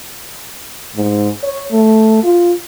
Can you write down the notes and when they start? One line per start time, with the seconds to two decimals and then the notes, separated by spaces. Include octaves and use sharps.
0.96 G#2
1.43 C#5
1.72 A3
2.23 F4